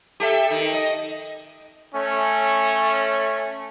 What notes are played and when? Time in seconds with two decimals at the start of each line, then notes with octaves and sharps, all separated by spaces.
0.20 G4 A4 E5
0.51 D#3
0.73 D#5
1.95 A3 C#4